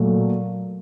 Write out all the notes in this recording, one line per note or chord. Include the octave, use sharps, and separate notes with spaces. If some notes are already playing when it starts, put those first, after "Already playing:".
Already playing: A#2 F#3 A3